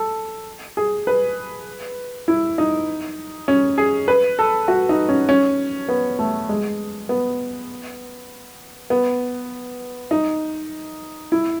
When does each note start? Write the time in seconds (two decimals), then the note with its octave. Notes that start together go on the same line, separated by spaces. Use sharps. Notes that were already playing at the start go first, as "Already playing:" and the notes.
Already playing: A4
0.77 G#4
1.07 B4
2.28 E4
2.58 D#4
3.48 C#4
3.78 G#4
4.08 B4
4.39 A4
4.68 F#4
4.89 D#4
5.09 C#4
5.29 C#4
5.89 B3
6.19 A3
6.49 G#3
7.09 B3
8.90 B3
10.11 D#4
11.32 E4